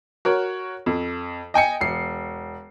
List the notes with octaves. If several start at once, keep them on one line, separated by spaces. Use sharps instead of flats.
F#4 A#4 C#5
F2
D#5 G5 G#5 C#7
E1 C7